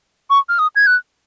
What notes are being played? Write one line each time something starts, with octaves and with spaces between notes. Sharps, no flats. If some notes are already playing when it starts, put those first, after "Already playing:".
C#6
F6
D#6
G#6
F#6